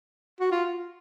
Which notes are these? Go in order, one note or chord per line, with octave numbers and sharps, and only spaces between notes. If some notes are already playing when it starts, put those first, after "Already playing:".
F#4
F4